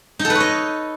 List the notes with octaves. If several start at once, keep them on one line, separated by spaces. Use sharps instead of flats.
D#4
A4
B4
C#5
D#5